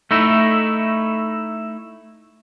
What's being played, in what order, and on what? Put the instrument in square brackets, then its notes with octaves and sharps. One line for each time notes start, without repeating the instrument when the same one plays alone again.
[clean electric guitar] A3 D#4 E4